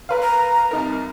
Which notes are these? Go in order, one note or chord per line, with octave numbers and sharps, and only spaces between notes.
A#4 B4 F5
A#5
C2 D#4 A#4